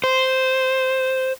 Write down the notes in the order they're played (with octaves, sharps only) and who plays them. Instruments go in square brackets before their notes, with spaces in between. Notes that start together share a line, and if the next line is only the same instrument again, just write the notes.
[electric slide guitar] C5